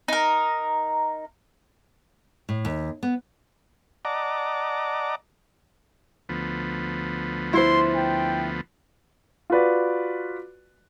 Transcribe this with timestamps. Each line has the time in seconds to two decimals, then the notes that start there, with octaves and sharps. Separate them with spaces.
0.08 D#4 A#4
2.49 A2
2.65 D#2
3.03 B3
4.05 D5 D#5 F#5 A5 A#5 D6
6.29 D2 F3 B3
7.53 E4 C5 C6
7.94 G5
9.50 F4 F#4 B4 D5